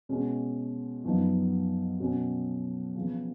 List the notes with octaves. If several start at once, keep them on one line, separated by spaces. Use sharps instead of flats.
B2 G#3 C#4
F#2 F3 B3 D#4
B2 F#3 C#4
C#3 F3 B3